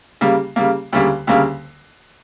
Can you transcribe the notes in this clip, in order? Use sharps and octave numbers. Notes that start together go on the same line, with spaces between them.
C#3 G3 A#3
C#3 G3 A#3
D2 C#3 G3 A#3
D2 C#3 G3 A#3